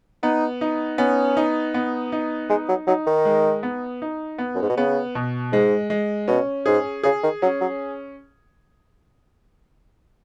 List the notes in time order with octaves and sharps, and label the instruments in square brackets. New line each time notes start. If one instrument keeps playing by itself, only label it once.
[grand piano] B3 [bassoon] D#4
[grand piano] D#4
[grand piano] B3 [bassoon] C#4
[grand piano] D#4
B3
D#4
[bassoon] G#3 [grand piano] D#4
[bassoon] F#3
[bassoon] F#3 [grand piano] D#4
[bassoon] D#3
[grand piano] G#3
B3
D#4
B3
[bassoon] F#2
G#2
B2
[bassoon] C#3 [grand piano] B3
[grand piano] B2
[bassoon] G#2 [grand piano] G#3
[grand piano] G#3
[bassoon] B2 [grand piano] C#4
[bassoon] G#2 [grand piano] G#4
[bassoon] C#3 [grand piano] G#4
[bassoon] D#3
[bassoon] F#3 [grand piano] C#4
[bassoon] F#3